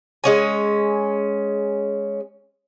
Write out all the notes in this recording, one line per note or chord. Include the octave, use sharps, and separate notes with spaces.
G#3 C#4 G#5